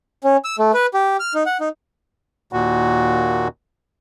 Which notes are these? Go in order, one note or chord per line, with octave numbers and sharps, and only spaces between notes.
C#4
E6
A3
B4
G4
F6
D#4
F#5
D#4
D#2 A#2 F#4